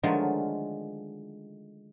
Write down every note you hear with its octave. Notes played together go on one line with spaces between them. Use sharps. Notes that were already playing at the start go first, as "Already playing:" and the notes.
D3 D#3 F3 F#3 G#3 A3